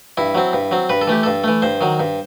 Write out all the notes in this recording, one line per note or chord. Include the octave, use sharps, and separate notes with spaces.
G2 E4
F#3 C4
G2
F#3 C4
G2 B4
A4
E3 A3 G4
G2 A4
E3 A3
G2 C5
D#3 F#3
G2